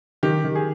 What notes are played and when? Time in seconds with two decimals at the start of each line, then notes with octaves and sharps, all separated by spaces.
0.23 D#3 G4
0.44 D#3
0.55 G#4